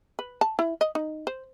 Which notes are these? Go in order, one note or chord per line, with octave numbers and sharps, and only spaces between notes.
B4
A5
E4
D#5
D#4
C5